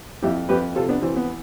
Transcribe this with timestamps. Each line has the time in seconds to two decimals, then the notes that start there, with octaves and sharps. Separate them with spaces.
0.22 F2 E4 G4
0.49 F2 G4 B4
0.75 C3 F4 A4
0.89 B3 D4
1.02 E3 C4
1.16 B3